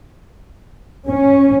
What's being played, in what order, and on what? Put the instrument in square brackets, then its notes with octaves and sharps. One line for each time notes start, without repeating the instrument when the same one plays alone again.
[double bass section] C#4